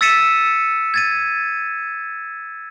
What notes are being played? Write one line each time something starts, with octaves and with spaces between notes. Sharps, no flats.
E6 A6 B6 C#7 D#7 E7
G#6 A6 D#7